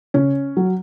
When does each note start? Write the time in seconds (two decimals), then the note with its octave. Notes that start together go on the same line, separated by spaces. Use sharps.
0.14 C#3 C#4
0.57 F#3